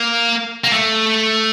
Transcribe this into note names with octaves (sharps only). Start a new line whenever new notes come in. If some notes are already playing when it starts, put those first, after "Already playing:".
Already playing: A#3
A#3
A3